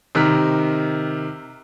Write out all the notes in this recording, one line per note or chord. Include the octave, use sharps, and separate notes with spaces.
C3 D#3 A#4 F6 F#6 B6